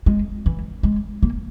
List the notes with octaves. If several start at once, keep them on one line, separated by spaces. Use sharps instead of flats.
G#3
E3
G#3
A#3